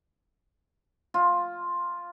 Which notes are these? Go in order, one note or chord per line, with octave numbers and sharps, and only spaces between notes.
F4